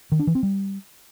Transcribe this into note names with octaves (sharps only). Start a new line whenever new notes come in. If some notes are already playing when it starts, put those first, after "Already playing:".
D#3
D4
E3
C4
G3